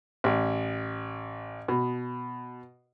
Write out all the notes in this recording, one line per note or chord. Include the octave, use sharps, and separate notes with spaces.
A1
B2